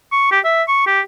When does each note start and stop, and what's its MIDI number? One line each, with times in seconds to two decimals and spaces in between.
0.12 0.27 85
0.31 0.40 67
0.44 0.63 76
0.68 0.84 85
0.87 1.01 67